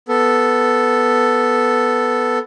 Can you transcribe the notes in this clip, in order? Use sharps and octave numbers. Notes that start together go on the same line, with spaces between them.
B3 A4